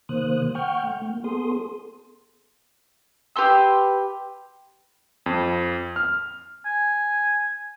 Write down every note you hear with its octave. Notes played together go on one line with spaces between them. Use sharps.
C3 D#3 A#3 C5 D#6 F#6
F#5 G5 C#6 F6 G6
A3
A#3
B3 G#4 A4 C6 D#6
G4 B4 C6 E6
F2
F6
G#5